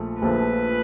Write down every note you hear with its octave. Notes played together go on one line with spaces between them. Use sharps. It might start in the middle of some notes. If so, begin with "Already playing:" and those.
Already playing: A#1 A#2 F3 A3
A#1 A#2 F3 A3 B4